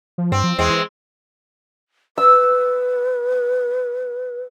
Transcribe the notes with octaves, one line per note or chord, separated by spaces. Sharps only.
F3
G2 C4
F3
E2 G#3 C4
E3
B4 E6